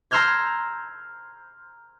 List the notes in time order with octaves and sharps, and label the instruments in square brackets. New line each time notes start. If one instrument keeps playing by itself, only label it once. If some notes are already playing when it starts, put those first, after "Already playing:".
[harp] A#5 C6 E6 F6 G6 G#6